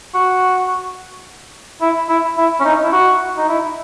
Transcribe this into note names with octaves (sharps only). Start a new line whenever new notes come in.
F#4
E4
E4
E4
C#4
D#4
E4
F#4
D#4
E4